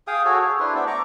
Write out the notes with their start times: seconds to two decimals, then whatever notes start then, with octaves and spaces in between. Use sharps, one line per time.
0.07 G#4 F5 G5 D#6
0.25 F#4 G#4 A4 C#5
0.40 C#5
0.59 D4 E4 B4 C5
0.75 A3 B3 A4 D5
0.87 A#5 C#6 D6